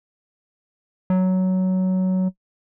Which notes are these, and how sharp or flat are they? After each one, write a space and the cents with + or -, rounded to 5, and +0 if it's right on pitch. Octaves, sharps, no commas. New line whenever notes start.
F#3 +10